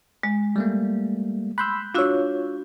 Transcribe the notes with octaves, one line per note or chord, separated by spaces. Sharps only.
G#3
G3 A3 A#3
B5 C6 E6 F#6 G6
D4 F4 F#4 C#5 E6